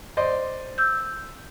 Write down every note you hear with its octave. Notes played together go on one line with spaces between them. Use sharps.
C5 D5 D#5
E6 G6